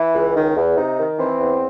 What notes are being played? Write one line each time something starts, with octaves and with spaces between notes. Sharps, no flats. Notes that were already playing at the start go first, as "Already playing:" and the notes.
Already playing: E3 E4
C#2
D#3
E2
C3 D#4
D#3
E3 C4
E2